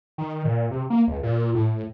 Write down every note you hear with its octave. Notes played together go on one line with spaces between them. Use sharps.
D#3
A#2
C3
A#3
C#2
A#2
A2